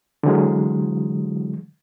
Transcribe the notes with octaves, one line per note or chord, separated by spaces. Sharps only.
D3 E3 F#3 G#3